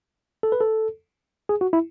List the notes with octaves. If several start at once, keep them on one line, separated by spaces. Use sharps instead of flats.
A4
B4
A4
G#4
F#4
E4